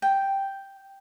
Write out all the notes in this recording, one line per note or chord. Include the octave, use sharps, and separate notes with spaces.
G5